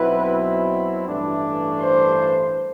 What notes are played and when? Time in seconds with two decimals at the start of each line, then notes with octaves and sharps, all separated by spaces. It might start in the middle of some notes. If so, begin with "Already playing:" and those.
Already playing: B1 B2 F#3 C4 E4 B4
1.07 A1 G2 E3 A3 D4
1.81 C5